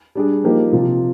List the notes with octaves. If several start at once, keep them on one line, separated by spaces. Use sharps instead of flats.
G3 D4 G#4
F3 A#3 D#4 G4 A#4
C3 F3 C4 F4 C5